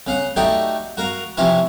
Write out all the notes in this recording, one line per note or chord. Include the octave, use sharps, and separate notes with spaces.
C#3 F5 F#5
A3 D#4 F#4 G4 D5
F#4 A#4 F5
C3 E3 F3 C#4 E4 F4